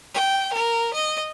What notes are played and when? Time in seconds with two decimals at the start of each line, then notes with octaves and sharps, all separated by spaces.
0.14 G5
0.53 A#4
0.93 D#5